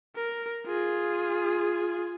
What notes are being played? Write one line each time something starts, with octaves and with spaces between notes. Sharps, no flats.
A#4
F4 G#4